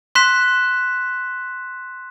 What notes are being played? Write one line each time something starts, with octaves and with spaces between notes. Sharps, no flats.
C6 F#6 B6 E7